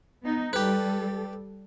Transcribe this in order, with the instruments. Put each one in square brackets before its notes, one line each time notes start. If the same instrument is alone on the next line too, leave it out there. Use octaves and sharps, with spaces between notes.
[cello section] B3 D#4
[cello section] G3 A4 [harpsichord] G4 B4